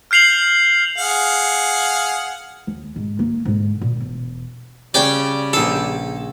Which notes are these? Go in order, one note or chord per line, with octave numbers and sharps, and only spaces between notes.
F6 G6 C7 F7 F#7
G#4 F5 F#5
D#2
G#2
A#3 D#4
G#2 D3
A#2
E1
C#3 G3 C#4 D5 G5
A#1 G#4 A4 E6